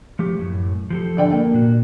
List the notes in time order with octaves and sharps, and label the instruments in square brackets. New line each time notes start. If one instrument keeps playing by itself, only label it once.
[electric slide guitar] F3 A3 G4
F#2 A2
F3 G4 A4
[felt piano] D3 D5 G5
A#3
[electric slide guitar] A#2 F#4